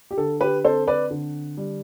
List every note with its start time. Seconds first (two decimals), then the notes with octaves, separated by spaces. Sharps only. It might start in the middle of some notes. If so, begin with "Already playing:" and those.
0.11 G4
0.17 D3 A4
0.41 G4 B4
0.64 C4 A4 C5
0.87 B4 D5
1.10 D3
1.57 G3